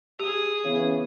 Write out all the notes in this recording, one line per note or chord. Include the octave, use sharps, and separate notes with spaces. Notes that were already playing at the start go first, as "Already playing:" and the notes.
G4 G#4 D#6
C#3 E3 B3 C#4